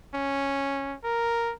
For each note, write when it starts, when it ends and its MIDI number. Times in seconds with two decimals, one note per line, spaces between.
0.15 0.96 61
1.04 1.53 70